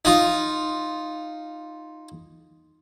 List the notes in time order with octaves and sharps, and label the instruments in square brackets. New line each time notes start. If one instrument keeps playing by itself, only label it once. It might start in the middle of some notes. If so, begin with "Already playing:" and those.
[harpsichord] D#4 F4